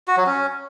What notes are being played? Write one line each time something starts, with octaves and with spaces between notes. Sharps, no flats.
F#4
F#3
C#4